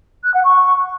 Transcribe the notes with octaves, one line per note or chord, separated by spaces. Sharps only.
F#6
F#5
C#6